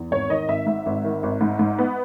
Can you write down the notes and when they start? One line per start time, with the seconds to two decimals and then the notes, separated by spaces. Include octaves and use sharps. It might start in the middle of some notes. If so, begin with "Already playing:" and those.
Already playing: E2
0.11 G#1 C#5
0.29 D#3 D#5
0.48 G#1 E5
0.66 G#2 E5
0.86 G#1
1.04 D#3
1.23 G#1
1.41 G#2
1.59 G#2
1.78 B3